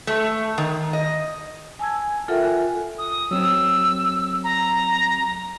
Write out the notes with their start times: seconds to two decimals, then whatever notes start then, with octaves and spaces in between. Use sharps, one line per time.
0.07 A3
0.58 D#3
0.93 D#5
1.79 G#5 A5 E6 G#6
2.28 F4 A4 A#4 E5 F#5 G5
2.41 G#5 F#6
2.98 D#6
3.31 F#3 C4 E6
4.44 A#5